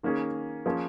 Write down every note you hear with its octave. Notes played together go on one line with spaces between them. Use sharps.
D#3 A#3 C#4 G#4
F3 A#3 C#4 G#4